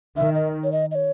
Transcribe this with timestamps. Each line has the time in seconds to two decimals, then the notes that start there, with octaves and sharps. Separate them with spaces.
0.17 D#3 E5
0.35 D#5
0.64 C#5
0.72 D#5
0.91 D#5
0.95 C#5